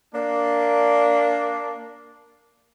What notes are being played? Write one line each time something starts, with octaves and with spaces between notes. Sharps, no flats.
A#3 D4